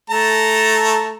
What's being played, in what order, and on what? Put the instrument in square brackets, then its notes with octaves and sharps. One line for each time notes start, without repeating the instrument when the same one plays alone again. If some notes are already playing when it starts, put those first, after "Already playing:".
[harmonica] A3 A5 A#5